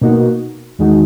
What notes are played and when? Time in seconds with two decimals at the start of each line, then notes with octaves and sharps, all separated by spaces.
0.01 B2 A#3 D#4 F#4
0.79 E2 D#3 G#3 D#4 F#4